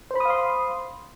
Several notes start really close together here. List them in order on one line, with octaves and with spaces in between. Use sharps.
C5 B5 D#6 F5 C6